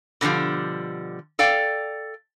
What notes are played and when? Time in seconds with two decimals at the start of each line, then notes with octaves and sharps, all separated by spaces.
0.21 B2 D3 E3 F3 G3
1.39 A4 D5 F5 G5